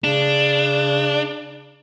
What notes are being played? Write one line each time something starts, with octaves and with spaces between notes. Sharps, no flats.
C#3 D4